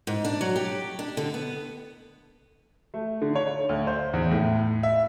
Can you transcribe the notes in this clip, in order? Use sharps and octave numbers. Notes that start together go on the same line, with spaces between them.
G#2
D4
F#3
G4
D4
D3
B3
A3
D3
C#5
D2
C5
E2
A2
E5